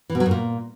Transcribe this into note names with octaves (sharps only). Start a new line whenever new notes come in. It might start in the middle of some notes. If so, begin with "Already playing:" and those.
E3
B2
F#3
F#2
A#2